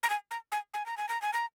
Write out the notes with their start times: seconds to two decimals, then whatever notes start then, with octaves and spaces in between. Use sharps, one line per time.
0.03 A#5
0.10 G#5
0.31 A#5
0.52 G#5
0.74 G#5
0.86 A#5
0.97 G#5
1.09 A#5
1.22 G#5
1.33 A#5